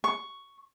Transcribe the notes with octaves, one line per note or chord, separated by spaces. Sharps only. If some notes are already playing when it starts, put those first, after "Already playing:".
C#6